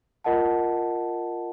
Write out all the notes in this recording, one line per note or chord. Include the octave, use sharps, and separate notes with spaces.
F4 A#4 D#5 F#5 A5